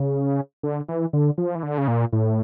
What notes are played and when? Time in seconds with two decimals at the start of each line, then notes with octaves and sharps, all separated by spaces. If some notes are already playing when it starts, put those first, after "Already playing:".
Already playing: C#3
0.63 D3
0.89 E3
1.13 D3
1.38 F3
1.55 E3
1.63 D3
1.78 C#3
1.88 A#2
2.13 A2